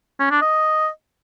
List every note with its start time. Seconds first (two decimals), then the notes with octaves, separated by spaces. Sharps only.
0.20 C#4
0.31 D4
0.42 D#5